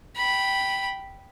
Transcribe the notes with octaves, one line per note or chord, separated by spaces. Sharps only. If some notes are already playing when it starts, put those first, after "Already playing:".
G5 B5